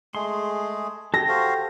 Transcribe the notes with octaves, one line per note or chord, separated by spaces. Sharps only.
G#3 A3 G#4 C6
G4 A4 A#6
F#4 C5 F5